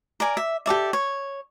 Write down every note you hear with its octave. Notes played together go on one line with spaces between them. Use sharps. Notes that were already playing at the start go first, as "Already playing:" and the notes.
A#4 D5 G#5
E5
G4 A4 D5 E5
C#5